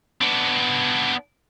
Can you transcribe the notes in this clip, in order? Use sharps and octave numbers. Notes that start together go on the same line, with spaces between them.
B3 D4